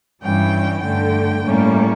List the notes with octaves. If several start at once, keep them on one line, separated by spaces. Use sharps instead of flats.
G2 E3 G3 C#4 G5
G2 D3 A3 G5
A2 G3 A#3 C#4